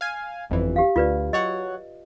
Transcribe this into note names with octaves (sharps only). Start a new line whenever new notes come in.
F5 G#5
G1 F2 E3
G4 F5
D2 F4 B4 D5
F#3 C#5 D#5 F#5